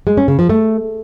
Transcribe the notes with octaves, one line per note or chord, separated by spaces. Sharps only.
G#3
C#4
C#3
F3
A3